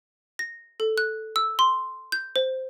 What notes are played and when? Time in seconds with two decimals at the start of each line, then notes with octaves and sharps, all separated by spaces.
0.39 A#6
0.80 A4
0.98 F#6
1.36 E6
1.59 C6
2.12 G6
2.36 C5